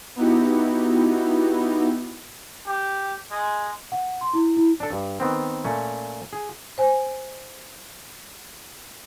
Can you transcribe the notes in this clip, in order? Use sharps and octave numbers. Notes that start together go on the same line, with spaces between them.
B3 D#4 E4 F#4 G4
G4
G#3
F#5
C6
E4
E4
D4 A4
G2
D#3 B3 C4
A#2 A3 C#4
G#4
C5 G#5